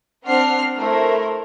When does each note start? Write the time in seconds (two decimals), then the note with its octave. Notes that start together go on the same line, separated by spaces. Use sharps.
0.24 C4 D4 F#5 F6 C7
0.77 A3 E4 A#4 C5